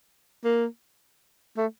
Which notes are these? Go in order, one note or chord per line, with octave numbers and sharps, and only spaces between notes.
A#3
A3